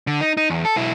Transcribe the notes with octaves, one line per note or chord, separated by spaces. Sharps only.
D3
D#4
D#4
E2
A4
B1 E4